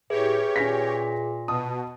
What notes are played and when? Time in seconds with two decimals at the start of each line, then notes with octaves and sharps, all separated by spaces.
0.10 A2 G4 G#4 B4 C#5 E5
0.56 A#2 C#4 A#6 B6
1.48 B2 A5 D#6